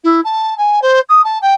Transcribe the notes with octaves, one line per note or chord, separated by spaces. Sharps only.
E4
A5
G#5
C5
D#6
A5
G5